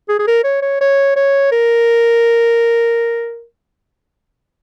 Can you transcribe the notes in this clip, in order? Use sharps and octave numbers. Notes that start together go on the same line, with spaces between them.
G#4
G#4
A#4
C#5
C#5
C#5
C#5
A#4